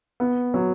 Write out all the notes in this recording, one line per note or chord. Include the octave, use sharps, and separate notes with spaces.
B3
F#3